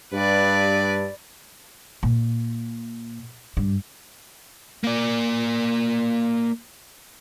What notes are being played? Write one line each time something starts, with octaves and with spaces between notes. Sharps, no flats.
G2 B4 D5
A#2
G2
A#3 D5